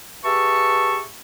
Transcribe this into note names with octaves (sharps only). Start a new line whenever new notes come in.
G4 G#4 B4 E5 A5 C#6